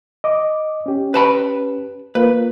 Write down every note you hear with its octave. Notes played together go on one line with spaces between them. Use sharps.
D#5 D6
C#4 G4
B4 A5 B5
A#3 F4 B4